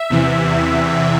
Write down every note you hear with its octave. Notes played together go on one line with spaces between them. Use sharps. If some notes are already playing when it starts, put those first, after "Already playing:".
Already playing: E5
E2 C3 E3